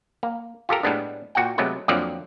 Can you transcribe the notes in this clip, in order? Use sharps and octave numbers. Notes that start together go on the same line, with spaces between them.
A#3
F4 G4 A4 A#4
A2 G3 G#3 B3 D4
A#2 F#4 F#5 G5
C3 F#3 G#3 A3 B3 B4
F2 D3 F3 F#3 A#3 D5